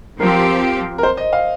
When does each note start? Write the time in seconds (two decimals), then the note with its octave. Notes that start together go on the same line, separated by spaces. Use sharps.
0.19 F3 C4 G4 A#4
0.98 A#4
1.03 C5
1.17 D#5
1.33 F5